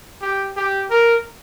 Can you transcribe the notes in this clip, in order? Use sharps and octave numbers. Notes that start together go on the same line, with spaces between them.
G4
G4
A#4